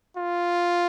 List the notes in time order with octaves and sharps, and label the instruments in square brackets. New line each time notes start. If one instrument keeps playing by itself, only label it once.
[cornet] F4